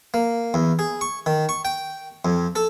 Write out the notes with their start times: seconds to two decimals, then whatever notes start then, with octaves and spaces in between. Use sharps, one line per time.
0.14 A#3
0.54 E2
0.79 G#4
1.01 C#6
1.26 D#3
1.49 C#6
1.65 G5
2.25 F2
2.56 A4